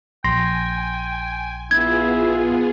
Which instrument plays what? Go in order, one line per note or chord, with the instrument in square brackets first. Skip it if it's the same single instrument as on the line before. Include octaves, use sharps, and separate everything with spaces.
[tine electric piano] A#1 C6 A#6 [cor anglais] G5 [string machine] G#5
[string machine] B3 F4 G#4 [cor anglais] E4 [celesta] G#6